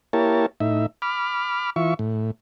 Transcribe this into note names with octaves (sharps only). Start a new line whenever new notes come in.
A#3 E4 G4 A#4 C#5 A5
A2 D#4 E5
B5 D6 F6
E3 F4 E5 C#6
A2